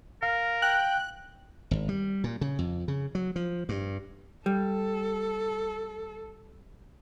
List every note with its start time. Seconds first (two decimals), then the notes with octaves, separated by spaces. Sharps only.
0.23 A#4 F5
0.62 G5 F#6
1.71 G#1
1.89 G3
2.24 A#2
2.41 C#3
2.59 F2
2.88 C#3
3.15 F#3
3.36 F3
3.69 G2
4.46 G3 A4